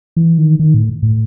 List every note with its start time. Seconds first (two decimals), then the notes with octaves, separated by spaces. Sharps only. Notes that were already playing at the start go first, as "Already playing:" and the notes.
0.16 E3
0.38 D#3
0.59 D#3
0.74 A2
1.03 A2